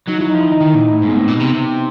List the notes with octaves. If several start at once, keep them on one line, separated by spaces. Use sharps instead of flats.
F#3 D#4
F#3 E4
F3 D#4
E4
D#3
D#4
D#3
A#2
A2 D#4
G#2
A#2 B3
A2 C4
A#2
B2
C3
C3